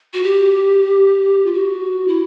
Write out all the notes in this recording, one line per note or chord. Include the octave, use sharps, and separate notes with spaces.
F#4
G4
F4
F#4
E4